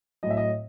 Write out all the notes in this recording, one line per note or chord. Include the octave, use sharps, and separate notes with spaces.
A2 F#3 D#5
E5
D#5